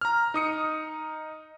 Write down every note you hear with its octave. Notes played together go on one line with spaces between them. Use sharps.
A#5 F6
D#4 D#6 C#7